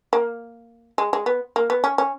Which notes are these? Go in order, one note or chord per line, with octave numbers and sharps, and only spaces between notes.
A#3
G#3
G#3
B3
A#3
B3
C#4
C#4